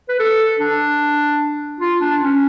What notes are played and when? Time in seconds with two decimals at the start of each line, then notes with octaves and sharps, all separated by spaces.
0.09 B4
0.20 A4
0.59 D4
1.80 F4
2.01 D4
2.20 C#4